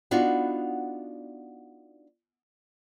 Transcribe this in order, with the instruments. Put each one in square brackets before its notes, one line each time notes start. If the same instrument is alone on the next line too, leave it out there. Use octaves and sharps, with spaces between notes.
[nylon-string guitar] B3 D4 D#4 F4 F#4